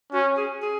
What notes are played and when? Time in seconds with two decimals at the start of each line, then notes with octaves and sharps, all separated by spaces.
0.12 C#4 F#4
0.37 G#4
0.62 G#4